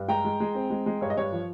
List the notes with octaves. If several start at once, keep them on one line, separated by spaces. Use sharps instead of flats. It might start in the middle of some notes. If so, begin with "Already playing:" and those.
Already playing: G2
G#3 G5 A#5
G#3
G#3
C4
G#3
G#3
G2 C#5
D#5
G2 C#5
F3